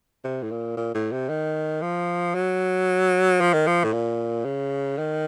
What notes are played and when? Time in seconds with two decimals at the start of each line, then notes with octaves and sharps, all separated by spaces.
0.24 C3
0.43 A2
0.51 A#2
0.77 A#2
0.94 A2
1.12 C3
1.29 D#3
1.82 F3
2.34 F#3
3.40 F3
3.53 D#3
3.67 F3
3.84 A2
3.93 A#2
4.45 C#3
4.98 D#3